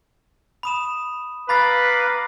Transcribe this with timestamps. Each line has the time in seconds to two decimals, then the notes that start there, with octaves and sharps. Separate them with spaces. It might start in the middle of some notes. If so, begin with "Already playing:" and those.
0.63 B5 D#6 E7
1.49 B4 F5 A#5 B5 D6 A6 B6